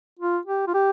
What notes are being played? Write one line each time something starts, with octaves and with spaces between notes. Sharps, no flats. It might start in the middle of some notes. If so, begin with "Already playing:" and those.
F4
G4
F4
G4